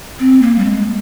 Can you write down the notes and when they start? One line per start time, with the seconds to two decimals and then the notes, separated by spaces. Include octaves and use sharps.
0.19 C4
0.42 A#3
0.58 G3
0.65 G#3